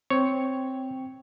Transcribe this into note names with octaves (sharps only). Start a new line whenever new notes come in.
C4 C#5 G5